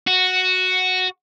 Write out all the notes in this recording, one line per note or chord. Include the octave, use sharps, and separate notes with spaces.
F#4